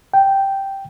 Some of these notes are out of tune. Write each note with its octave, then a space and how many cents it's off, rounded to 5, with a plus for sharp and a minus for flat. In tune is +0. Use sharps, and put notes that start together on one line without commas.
G5 -5